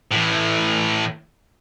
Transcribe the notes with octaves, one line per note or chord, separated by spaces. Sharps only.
A2 E3